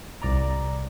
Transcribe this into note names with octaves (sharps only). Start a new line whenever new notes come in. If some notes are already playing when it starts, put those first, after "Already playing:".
C2 D5 A#5